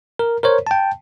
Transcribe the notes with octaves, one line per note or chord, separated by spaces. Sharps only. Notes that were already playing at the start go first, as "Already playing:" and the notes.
A#4
A#4 C5 C#5
G5 A5